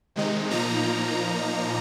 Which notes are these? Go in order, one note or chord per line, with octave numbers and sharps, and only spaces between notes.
C3 D#3 G#3 D#4
A#2 F3 A#3 D#4 A#5